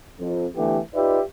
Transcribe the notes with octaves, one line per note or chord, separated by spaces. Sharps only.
F2
D3 E3 A3 B3 G4
D#4 F4 G4 B4 D5 E5